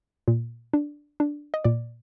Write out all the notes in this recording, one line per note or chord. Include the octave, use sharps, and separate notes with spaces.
A#2
D4
D4
D#5
A#2 D5